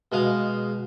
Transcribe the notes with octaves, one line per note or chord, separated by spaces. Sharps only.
B2 G#3 F5